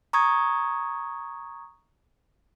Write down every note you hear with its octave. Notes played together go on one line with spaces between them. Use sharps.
A#5 C#6 D#6 G#6